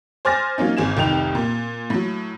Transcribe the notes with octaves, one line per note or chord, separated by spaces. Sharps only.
C5 G#5 D6 F6 A6 A#6
F#3 A#3 C#4 D#4
G#1 G#4 E7
F1 C2 D#3 D#4 G5 F7
A#2
A2 F#3